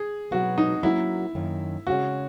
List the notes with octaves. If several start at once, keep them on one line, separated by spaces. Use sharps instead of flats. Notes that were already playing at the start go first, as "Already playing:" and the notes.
Already playing: G#4
B2 F#3 B3 F#4
D#4
F#3 A#3 C#4 E4 F#4 A#4
F#2 D#3 A#3
C#3 G#3 C#4 F#4